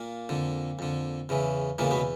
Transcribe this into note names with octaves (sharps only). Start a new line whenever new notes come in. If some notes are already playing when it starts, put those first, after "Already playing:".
Already playing: A#2 A#3
F2 D3
F2 D3
E2 C#3 E3
E2 A#2 C#3 E3 A#3
B2 B3